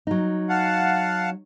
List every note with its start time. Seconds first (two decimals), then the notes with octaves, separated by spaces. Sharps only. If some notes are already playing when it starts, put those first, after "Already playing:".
0.07 F#3 D#4
0.49 F5 F#5 A5